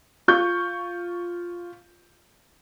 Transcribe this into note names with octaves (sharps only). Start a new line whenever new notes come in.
F4 C#6 G6